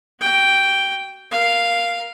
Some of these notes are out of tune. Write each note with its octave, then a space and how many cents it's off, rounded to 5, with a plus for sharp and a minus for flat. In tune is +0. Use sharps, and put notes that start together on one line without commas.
F#4 +30 G5 +0
A#4 +15 F5 +0